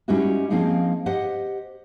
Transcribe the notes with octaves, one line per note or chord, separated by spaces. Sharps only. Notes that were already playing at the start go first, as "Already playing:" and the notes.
G3 G#3 C#4 D#4 E4 F#4
F3 A#3 C4 C#4 D#4 G#4
G4 C5 D#5 F#5